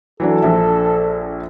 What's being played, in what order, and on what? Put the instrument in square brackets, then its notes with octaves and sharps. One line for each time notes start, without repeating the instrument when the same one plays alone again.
[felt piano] E3 F#3 D4 [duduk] A4
[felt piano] A#1 D4 E5